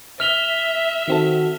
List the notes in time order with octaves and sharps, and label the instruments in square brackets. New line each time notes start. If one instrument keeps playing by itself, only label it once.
[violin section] E5 [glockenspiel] F6 F7 G7
[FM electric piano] D#3 C4 A4 [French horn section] F#4